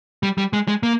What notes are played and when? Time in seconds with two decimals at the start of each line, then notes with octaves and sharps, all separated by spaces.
0.23 G3
0.38 G3
0.53 G#3
0.68 G#3
0.83 A#3